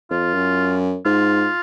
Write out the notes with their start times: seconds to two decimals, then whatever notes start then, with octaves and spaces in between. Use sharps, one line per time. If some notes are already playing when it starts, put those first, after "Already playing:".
0.11 F2 F4
0.34 F#2
1.05 G#2 F4